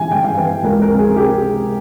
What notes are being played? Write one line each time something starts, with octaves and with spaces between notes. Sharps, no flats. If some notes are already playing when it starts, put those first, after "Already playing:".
Already playing: G2 E3 G3 G#5
G2 G5
F5
E3 G3 B4
C#2 A#4
A#4
C3 F3
G#4
G4